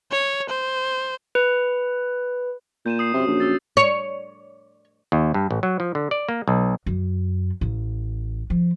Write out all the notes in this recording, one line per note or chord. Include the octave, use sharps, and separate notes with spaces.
C#5
C5
B4
A#2 G6 D#7 E7
D#6 C7
F#2 C3
A#1
D6 E6 A6
C#5
D#2
G2
A1
F#3
F3
D3
D5
A#3
B1
F#2
A1
F3